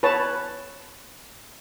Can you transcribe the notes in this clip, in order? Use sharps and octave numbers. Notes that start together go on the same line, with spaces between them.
B4 C#5 A5